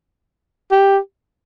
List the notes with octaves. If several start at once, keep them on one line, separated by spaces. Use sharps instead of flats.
G4